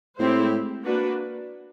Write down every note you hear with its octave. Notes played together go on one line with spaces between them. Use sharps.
A2 G#3 C4 E4 G4 C5
A#3 D4 F#4 B4